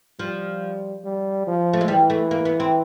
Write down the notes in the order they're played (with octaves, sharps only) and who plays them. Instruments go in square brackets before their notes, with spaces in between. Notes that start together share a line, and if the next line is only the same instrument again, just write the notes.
[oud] F3 [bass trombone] G3
[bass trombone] G3
F3
[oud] A3
G#3
[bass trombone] E3 [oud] G3
[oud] A3
A#3
B3
C4